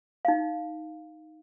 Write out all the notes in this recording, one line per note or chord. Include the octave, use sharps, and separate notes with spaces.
D#4 F5